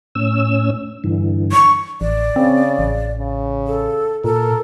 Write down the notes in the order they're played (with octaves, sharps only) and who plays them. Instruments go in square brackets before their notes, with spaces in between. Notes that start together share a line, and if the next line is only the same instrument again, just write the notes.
[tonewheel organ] A2 C#4 E6
G2 D3 E3
[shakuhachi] C#6
[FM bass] A1 [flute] D5
[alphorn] C#3 [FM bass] C4
[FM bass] A1
[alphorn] C#3
[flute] A4
[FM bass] A#2 [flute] A4 [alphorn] A#4